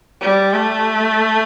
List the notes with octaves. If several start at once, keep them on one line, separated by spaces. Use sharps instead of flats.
G3
A3